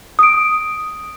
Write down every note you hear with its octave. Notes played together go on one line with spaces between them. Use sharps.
D#6 D7